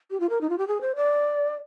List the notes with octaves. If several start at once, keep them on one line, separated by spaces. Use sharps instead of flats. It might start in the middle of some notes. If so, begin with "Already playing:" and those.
G4
F4
A#4
D#4
F4
G4
G#4
C5
D5